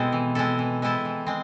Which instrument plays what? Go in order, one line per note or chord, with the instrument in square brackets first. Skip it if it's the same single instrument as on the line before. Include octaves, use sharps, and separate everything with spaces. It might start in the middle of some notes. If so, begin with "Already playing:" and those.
Already playing: [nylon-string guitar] B2 [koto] G#3 C4 E4 A4
[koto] E3
G#3 C4 E4 A4
E3
G#3 C4 E4 A4
E3
G#3 C4